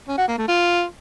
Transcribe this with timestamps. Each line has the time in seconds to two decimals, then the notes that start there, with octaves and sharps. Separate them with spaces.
0.08 C#4
0.18 F#4
0.28 A#3
0.38 A3
0.48 F4